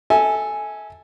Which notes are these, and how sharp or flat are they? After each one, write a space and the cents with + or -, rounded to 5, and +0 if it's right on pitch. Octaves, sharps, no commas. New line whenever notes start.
A4 +0 E5 -30 G#5 +0